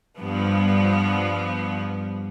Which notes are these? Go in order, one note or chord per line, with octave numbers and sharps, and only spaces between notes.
G2 F3 B3